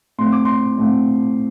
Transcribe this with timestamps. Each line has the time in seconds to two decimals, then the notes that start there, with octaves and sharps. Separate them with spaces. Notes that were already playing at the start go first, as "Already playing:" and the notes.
0.18 A2 A3 C4 C6
0.32 D6
0.45 C6
0.78 A2 A3 C4